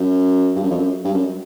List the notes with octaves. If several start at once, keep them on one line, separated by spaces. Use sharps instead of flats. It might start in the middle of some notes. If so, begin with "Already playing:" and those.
Already playing: F#2
G2
F#2
F2
F#2
G2
F#2